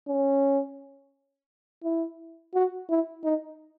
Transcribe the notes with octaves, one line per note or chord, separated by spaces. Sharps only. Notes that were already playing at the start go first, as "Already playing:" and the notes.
C#4
E4
F#4
E4
D#4